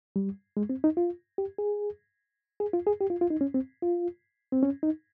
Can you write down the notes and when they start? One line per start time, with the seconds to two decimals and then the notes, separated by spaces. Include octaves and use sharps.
0.16 G3
0.57 G#3
0.70 C4
0.84 D#4
0.97 F4
1.38 G4
1.58 G#4
2.60 G#4
2.73 F4
2.87 G#4
3.01 G4
3.10 F4
3.21 F4
3.30 D#4
3.41 C#4
3.54 C4
3.82 F4
4.52 C4
4.63 C#4
4.83 D#4